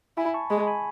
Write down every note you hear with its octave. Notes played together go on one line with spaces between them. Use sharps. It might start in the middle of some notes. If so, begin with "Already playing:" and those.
E4 G#5 B5
A5 C#6
G#3 G#5 B5
G#5 B5